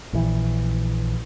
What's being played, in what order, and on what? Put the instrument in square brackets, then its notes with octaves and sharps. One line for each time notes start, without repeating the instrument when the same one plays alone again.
[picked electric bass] A#1 E3